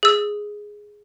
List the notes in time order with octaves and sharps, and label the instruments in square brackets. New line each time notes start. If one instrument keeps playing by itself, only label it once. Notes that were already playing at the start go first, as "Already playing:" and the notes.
[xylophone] G#4 E6